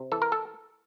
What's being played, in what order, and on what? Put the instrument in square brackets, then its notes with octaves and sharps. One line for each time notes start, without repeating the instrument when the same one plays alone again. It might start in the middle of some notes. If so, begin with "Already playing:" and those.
Already playing: [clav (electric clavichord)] C3
E3 A4
A#4
A4